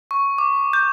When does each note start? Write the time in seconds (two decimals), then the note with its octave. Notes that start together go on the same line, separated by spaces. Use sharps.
0.11 C#6
0.38 D6
0.73 G6